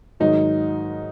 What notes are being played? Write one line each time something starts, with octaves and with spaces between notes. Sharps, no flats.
G#2 D#3 F#3 D#4